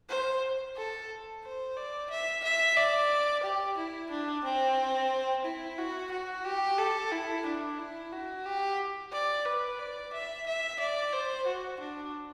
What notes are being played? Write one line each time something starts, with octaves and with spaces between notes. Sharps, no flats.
C5
A4
C5
D5
E5
E5
D5
G4
E4
D4
C4
E4
F#4
F#4
G4
A4
E4
D4
E4
F#4
G4
D5
B4
D5
E5
E5
D5
C5
F#4
D4